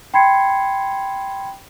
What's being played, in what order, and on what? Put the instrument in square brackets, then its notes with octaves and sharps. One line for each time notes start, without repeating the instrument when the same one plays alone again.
[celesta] G5 B5 C6 G#6 C7 C#7